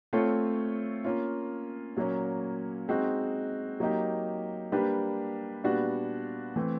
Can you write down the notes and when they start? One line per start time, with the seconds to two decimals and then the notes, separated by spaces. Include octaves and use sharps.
0.13 A3 C4 F4 A4 C#5
1.04 A#3 C#4 F4
1.96 A#2 F#3 A#3 C#4
2.88 G#3 C4 D#4 F#4
3.80 F#3 A#3 D#4 G4
4.72 G3 A#3 D4 G4 B4
5.64 A#2 G3 B3 D4 F#4
6.56 E3 A3 C4